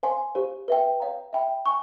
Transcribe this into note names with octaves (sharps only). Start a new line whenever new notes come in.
C5 F5 G#5 C6
G4 C5 F5
B4 E5 G5
C#5 F5 A#5
E5 G5 B5
G#5 C#6